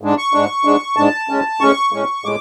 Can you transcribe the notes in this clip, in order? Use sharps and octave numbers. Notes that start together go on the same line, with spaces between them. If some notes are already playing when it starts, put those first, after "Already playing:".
G#2 G#3 D4
C#6
G#2 G#3 D4
G#2 G#3 D4
G#2 G#3 D4 A5
A2 G#3 C#4
A2 G#3 C#4 C#6
A2 G#3 C#4
A2 G#3 D6